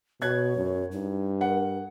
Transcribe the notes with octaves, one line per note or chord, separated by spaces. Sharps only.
B2 C#5 F#6 G#6
F#2
G2 D#4
A#4 F#5